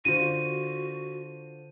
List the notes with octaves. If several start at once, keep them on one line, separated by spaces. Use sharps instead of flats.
D3 F4 F#4 C5 D#7